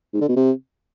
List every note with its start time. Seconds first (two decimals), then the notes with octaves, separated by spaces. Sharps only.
0.13 G#2
0.21 D3
0.29 B2
0.36 C3